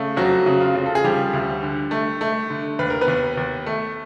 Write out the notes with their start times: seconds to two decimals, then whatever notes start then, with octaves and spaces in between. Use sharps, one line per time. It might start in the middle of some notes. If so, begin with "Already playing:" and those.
Already playing: C#3 A3
0.17 F2 F#3 F#4
0.46 C#3
0.61 F4
0.75 C#3
0.86 A4
0.95 G#4
1.04 F3 G3 G4
1.33 D2
1.63 D3
1.91 A3
2.21 A3
2.50 D3
2.79 D#2 B4
2.90 A#4
3.01 B3 B4
3.08 D#2
3.37 D#2
3.66 A3